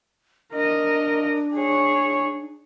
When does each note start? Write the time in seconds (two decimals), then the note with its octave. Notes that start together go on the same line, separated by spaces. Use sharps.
0.54 D4 A#4 D#5
1.54 G#4 C#5